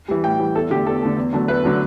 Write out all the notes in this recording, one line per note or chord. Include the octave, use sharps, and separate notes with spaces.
E3 G3
A2 G5
E3 G3
E2 A4
D3 A3 G4
E2 A4
D3 A3
E2
D3 F#3 A3
E2 B4
D3 F#3 A3